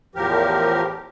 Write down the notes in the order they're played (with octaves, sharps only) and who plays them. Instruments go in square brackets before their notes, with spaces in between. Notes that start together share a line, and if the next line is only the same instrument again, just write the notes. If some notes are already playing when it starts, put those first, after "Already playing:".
[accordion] E2 A2 F3 G4 A#4